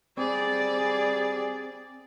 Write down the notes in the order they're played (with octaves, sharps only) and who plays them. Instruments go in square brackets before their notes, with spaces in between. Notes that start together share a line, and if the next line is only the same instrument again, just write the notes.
[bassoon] G3 [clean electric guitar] C4 [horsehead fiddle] G#4 D5